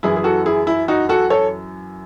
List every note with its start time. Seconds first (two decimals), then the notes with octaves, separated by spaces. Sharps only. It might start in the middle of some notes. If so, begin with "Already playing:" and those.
0.03 F#2 E3 E4 G#4
0.16 G#4
0.24 F#4 A4
0.46 E4 G#4
0.67 E4
0.88 D#4 F#4
1.09 F#4 A4
1.30 A4 C#5